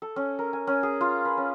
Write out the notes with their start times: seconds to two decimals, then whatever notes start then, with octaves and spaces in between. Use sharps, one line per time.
0.02 A4
0.16 C#4
0.39 A#4
0.53 G#5
0.67 C#4
0.83 G#4
1.01 F4
1.25 B4
1.38 C#4